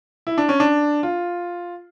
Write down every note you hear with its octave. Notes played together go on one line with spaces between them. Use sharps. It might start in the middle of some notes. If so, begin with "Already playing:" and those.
E4
D4
C#4
D4
F4